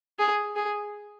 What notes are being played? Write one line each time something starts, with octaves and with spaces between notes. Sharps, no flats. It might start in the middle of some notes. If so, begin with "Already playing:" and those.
G#4
G#4